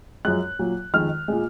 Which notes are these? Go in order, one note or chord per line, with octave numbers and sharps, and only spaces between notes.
F#2 F3 G#3 F#6
A#2 F#3
F2 D#3 G#3 F6
A#2 G#3